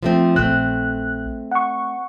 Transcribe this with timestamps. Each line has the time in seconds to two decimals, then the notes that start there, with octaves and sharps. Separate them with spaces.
0.03 F3 A3 C4
0.36 A#1 A3 C4 F#6
1.51 F#5 C#6